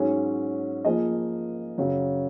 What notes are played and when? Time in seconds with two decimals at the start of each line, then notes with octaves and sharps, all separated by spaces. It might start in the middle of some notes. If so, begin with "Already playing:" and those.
Already playing: G#2 F#3 C#4 G#4
0.85 F3 A#3 F4 G#4 D#5
1.78 F#2 C#3 F#3